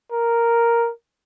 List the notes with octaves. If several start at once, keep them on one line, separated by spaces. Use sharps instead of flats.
A#4